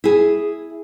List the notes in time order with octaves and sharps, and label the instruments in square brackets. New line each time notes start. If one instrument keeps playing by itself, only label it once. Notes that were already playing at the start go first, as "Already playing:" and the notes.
[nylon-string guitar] E4 G#4